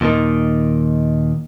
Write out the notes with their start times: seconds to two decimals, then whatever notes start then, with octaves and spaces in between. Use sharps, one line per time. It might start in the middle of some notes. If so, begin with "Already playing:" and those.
0.01 D#2 A#2 D3 D#3